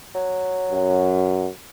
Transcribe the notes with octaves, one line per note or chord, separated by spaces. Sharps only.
F#3
F#2